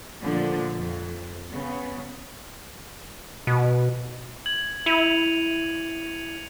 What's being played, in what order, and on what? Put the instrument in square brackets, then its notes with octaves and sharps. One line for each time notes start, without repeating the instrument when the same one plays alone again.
[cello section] A#2 D3 F3 A3
F2
C#3 B3
[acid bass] B2
[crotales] G#6 F#7
[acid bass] E4 [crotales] C#7 D#7 F7